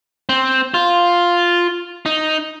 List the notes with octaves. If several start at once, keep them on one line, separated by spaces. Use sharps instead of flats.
C4
F4
D#4